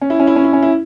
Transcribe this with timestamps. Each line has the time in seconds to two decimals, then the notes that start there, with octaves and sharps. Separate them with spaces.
0.01 C#4
0.10 E4
0.20 C#4
0.27 E4
0.36 C#4
0.44 E4
0.53 C#4
0.63 E4